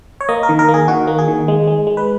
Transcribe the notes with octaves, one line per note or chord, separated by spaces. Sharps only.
C#5
A#3 D#5
A#4
D#3
A#4
A#3
G#4
D#3 F#4
A#3
G#4
D#3
G#3
G#3
G#3
B4